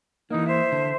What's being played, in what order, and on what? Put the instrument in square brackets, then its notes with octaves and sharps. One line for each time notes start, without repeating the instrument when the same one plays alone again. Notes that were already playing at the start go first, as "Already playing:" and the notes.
[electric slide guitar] E3 A#3 [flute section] D#4
[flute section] C5 E5
[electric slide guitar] D3